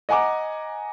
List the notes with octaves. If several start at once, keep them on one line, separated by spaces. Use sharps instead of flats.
D#5 F#5 G#5 A#5 D6